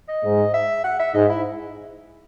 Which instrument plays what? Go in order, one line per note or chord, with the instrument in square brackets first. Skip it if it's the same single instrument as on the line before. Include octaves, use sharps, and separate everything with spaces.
[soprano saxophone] D#5
[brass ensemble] G#2
[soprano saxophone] E5
F#5
E5
[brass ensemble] G#2 [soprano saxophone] D#5
[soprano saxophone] E4